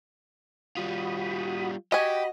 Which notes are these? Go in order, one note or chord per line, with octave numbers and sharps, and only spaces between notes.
G3 F4 F#4 B5 D#6
F#4 G4 D#5 G#5 B5